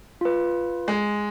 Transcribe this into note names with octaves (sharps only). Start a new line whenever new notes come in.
F4 B4
G#3